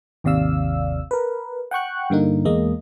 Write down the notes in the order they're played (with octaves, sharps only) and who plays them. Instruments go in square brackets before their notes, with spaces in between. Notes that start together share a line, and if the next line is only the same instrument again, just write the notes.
[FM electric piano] G#1 D#2 C3 D5 F5 E6
A#4 B4
F#5 G5 C#6 F#6
G2 D3 A#3 D#4
E2 G#3 A#3 D#5